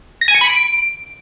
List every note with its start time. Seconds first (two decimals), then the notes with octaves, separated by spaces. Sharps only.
0.21 A#6
0.28 G#5
0.35 C#7
0.41 B5
0.48 D7